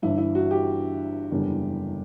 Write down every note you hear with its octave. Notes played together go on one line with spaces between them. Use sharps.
G1 G2 E3 E4
E4
F#4
G4
F#1 E2 D3 G3